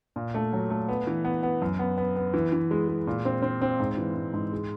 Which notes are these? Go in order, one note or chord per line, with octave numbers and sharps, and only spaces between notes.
A#2
A3
F#3
A3
B3
E3
B3
B3
F#2
B3
B3
B3
E3
E3
G#3
G#3
A#2
C4
C4
C4
G#2
E3
G#2
G#2
G#3